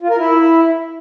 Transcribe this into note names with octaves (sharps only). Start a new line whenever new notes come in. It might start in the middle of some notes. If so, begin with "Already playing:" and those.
F4
A#4
E4